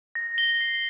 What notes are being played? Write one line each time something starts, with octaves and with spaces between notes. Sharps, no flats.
A#6
G7
C7